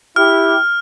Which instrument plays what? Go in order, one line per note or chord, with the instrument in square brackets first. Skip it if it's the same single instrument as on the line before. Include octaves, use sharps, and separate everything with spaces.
[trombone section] E4 G4 [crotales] F6